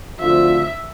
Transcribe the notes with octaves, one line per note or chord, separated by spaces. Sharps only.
D2 D3 F3 C4 F4 E5